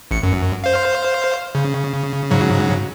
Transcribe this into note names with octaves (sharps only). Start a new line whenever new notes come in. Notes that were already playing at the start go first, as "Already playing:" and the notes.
A1 C#7
F#2
C5 F5
C#3
G#2 C#3 F#3